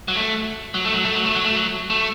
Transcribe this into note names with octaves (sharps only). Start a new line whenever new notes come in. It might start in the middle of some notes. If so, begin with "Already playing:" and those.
F#3
A3
F#3
A3
F#3
A3
F#3
A3
F#3
A3
F#3
A3